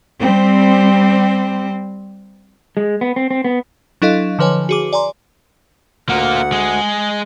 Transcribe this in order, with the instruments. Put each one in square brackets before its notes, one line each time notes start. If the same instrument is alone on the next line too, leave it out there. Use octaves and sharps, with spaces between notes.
[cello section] G3 C4
[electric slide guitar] G#3
B3
C4
C4
B3
[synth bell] F#3 D4 E4 A4 D#5 F5
D3 F3 B4 C#5 G#5
F#4 G#4 D6
D5 G#5 A#5 C6
[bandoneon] D2 F#5 [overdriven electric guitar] A#3 F4
[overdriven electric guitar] G#3 G#4